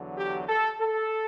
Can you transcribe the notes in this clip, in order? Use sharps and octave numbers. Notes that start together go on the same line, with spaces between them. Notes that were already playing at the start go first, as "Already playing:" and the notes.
Already playing: E2 D3 F#3
G4
A4
A4